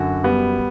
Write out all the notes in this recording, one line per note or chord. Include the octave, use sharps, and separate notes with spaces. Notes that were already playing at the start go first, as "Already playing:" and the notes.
Already playing: F#2 D3 F#4
G3 B3